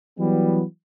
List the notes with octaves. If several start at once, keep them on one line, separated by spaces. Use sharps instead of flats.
E3 F#3 G3 B3